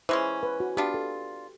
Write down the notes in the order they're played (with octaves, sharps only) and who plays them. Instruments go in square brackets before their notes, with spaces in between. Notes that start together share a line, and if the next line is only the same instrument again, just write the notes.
[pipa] E3 G#3 C#4 [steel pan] C5
[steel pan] B4
F#4
[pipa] B3 D4 F4 [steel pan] G4
[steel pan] A4